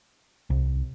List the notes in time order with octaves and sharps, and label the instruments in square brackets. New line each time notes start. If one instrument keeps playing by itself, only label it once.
[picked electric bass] C2